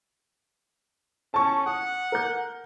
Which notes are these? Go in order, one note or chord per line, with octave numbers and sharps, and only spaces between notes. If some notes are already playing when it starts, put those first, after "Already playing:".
C#4 A5 C#6
F#5 D#6
A#4 G6